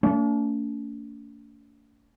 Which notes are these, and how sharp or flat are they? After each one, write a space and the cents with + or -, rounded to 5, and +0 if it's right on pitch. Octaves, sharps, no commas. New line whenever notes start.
A3 +45 D4 -45